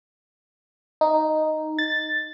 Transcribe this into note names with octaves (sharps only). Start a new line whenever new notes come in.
D#4
A6